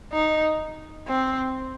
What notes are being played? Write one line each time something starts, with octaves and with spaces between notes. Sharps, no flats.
D#4
C4